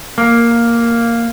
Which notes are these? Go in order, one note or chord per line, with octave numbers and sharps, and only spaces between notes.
A#3